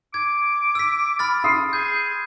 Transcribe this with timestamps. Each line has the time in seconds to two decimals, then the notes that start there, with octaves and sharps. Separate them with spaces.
0.14 D6 G#6
0.75 E6 B6
1.19 B5 F6 A6
1.44 C6 D#6 C7
1.73 G#4 G6